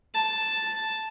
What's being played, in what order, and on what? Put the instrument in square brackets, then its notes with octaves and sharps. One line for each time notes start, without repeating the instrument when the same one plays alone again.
[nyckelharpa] A5